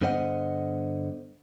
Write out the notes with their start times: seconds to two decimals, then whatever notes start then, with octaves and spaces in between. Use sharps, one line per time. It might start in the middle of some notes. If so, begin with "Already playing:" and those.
0.02 G2 D3 B3 C5 D#5 F#5